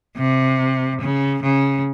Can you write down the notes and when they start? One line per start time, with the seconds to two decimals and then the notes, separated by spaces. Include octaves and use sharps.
0.17 C3
1.01 C#3
1.43 C#3